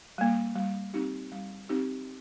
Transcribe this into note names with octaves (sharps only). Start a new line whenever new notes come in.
G3 A#3
G3
C4 D#4 G4
G3
C4 D#4 G4